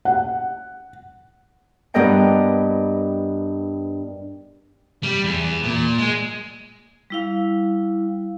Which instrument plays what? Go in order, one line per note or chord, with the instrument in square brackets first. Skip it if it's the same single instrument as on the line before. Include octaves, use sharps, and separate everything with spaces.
[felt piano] F#5
[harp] G2 B3 G4 A#4 D#5 G5
[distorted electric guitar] G3
E2
A#2
G#3
[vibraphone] G3 E4 F5